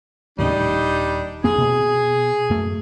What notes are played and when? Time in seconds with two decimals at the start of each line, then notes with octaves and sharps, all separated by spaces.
0.38 D#2 A2 C#3 G3 D4 D#4
0.58 D#1
1.44 F2 A#3 C4 G#4
1.58 B2
2.50 F#2 A3